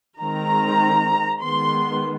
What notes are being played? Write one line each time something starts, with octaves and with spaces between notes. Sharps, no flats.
D#3 G#3 C4 A#5
D#3 G#3 B3 C6